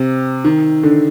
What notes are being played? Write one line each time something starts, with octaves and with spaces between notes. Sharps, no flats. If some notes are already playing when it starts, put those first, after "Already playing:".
Already playing: C3
D#3
D3